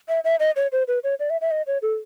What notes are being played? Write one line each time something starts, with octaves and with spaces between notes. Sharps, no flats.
E5
E5
D#5
C#5
C5
B4
C#5
D5
E5
E5
D#5
C#5
A4